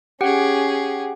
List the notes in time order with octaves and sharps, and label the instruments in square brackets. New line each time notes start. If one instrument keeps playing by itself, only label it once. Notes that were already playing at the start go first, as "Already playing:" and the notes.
[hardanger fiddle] C#4 G#4 [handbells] G4 F#5 G5